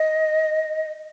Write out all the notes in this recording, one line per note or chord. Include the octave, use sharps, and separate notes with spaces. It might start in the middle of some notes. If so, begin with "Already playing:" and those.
Already playing: D#5